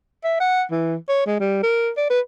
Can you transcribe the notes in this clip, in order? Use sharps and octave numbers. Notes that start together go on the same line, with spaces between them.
E5
F#5
E3
C#5
G#3
G3
A#4
D5
B4